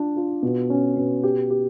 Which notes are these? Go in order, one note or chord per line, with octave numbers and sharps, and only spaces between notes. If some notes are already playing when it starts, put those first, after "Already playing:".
Already playing: D4 F4
F4
B2
C#4
B2
G4
G4